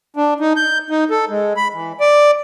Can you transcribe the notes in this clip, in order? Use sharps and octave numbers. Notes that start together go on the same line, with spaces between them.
D4
D#4
G6
D#4
A4
G#3
B5
E3
D5